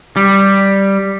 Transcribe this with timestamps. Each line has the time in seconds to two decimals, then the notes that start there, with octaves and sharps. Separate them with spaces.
0.17 G3